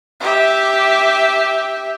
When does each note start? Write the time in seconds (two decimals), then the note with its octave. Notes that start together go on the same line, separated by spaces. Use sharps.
0.21 G4 E5